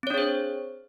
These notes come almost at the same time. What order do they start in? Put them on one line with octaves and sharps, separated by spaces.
C4 C#5 D4 G#4 C5